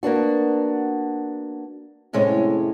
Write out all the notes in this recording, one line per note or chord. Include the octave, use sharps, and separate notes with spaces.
A#3 B3 D4 F#4
F2 A2 C3 G#3 C#4 C#5